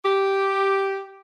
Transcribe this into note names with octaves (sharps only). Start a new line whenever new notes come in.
G4